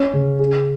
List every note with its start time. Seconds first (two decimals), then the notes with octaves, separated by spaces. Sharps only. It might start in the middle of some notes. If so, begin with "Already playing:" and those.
Already playing: C#4
0.13 C#3
0.39 G#4